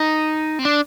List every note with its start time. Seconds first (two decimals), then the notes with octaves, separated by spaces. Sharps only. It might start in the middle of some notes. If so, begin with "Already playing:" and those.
Already playing: D#4
0.59 C4
0.65 D4